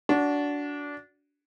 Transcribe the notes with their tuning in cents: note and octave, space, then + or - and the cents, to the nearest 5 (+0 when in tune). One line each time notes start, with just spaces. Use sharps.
D4 -20 F#4 +0